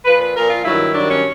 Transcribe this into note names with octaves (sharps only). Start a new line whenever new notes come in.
A#2 F3 B4
B4
A#2 F3 A#4
F4
G2 D#3 F#3 E4
G2 D#3 F#3 D4
C#4